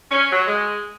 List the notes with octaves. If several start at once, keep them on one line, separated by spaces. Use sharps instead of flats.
C#4
F#3
G#3